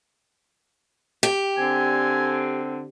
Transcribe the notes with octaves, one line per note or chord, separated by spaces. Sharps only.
G4
D3 C4 G#5